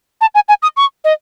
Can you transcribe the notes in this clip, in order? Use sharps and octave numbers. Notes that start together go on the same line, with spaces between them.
A5
G#5
G#5
D#6
C#6
D#5